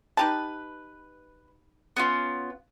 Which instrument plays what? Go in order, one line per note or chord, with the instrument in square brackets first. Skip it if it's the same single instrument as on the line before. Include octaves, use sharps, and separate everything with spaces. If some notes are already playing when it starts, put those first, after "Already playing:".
[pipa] D#4 G4 A5 [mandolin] B4
[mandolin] B3 C#4 F4